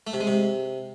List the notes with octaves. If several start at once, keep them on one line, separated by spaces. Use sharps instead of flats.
A3
C3
G#3
C3